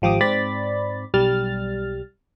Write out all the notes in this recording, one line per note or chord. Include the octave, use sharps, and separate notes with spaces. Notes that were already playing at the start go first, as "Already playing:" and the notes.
G#1 F3 G4 D6 D#6
G#2 C4 D5 B5 A6
B1 G3 F6 A6